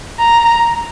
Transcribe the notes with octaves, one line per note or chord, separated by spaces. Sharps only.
A#5